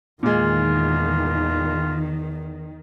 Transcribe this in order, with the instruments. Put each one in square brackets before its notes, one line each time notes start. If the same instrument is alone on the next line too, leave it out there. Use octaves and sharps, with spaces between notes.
[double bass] E2 [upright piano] A#2 G#3 [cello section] D#3 [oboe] F4